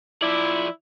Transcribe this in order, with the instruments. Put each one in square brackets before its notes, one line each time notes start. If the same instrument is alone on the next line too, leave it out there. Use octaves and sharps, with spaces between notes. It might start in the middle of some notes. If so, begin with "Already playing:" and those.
[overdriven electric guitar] F3 D5 [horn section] E4